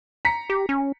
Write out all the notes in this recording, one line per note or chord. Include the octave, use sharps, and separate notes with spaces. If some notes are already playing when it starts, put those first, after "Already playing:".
A#5 B6 C#7
G4
C#4